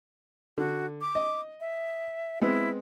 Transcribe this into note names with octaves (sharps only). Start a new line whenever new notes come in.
D3 F#4
D6
D#5
E5
G#3 B3 C4 E4